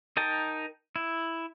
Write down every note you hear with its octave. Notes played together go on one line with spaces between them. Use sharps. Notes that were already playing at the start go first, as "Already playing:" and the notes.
D#4 A#4 G5 A5
E4